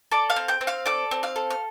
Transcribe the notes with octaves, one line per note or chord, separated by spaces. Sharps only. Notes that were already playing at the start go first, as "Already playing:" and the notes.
A4 D5 D6
F5 F6
C4
G5 G6
C4
F5 F6
A4 D5 D6
C4
F5 F6
A4
F6